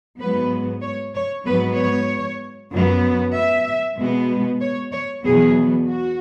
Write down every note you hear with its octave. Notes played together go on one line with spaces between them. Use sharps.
G#2 F#3 B3 B4
C#5
C#5
G#2 F#3 B3 B4
C#5
F#2 F#3 B3
E5
B2 G#3 B3
C#5
C#5
E2 B2 F#3 B3 G#4
F#4